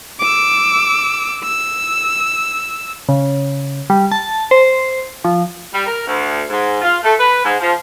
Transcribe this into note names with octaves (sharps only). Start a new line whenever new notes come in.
D6 E6
E6
C#3
G3
A5
C5
F3
G3
A#4
D2
G#2
F4
A3
B4
G#2
F3